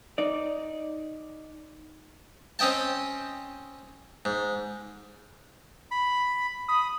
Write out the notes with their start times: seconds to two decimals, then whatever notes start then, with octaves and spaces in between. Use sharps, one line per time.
0.18 D#4 D5
2.59 C4 C#4 D#5 G5 A5
4.25 G#2
5.91 B5
6.68 B5 D#6